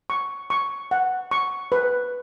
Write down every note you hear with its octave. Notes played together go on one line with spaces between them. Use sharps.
C#6
C#6
F#5
C#6
B4